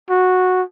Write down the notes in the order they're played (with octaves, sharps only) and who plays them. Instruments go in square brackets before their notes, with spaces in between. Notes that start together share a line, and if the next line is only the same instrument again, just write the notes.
[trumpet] F#4